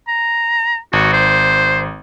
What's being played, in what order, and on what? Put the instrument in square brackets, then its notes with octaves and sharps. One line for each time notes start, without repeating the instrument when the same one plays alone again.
[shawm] A#5
[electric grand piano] G#1 [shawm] F#4
[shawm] C5